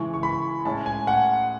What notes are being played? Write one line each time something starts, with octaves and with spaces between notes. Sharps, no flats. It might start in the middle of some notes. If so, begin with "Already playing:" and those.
Already playing: C#3 E3 G#3 C#6
C#6
B5
A2 G#3 C#4 A5
G#5
F#5